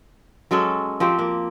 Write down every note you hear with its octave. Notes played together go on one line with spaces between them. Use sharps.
F#3 G#3 C#4 A4
F3 C4 G4
A#3